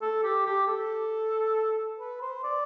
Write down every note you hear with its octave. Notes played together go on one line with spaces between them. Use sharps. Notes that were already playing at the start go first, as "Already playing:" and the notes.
A4
G4
G4
A4
B4
C5
D5